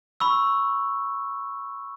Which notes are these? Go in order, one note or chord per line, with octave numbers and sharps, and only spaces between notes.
B5 C#6 E6